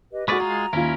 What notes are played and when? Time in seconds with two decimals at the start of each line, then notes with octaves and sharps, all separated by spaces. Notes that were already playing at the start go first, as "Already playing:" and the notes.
0.11 G4 B4 D#5
0.28 G#3 F#4 G#4 A4 B4 D5 C#6 F6
0.40 G#3 F4 G#4 A#5
0.73 D#2 C#4 E4 F4 A#4